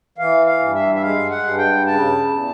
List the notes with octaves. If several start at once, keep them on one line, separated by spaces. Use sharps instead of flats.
E3 F5
F5
G2
E5
E5
G#3 F5
F#5
G2
G5
C#3 A5
E2